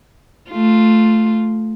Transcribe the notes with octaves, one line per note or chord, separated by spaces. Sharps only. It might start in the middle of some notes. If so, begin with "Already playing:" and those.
A3 F4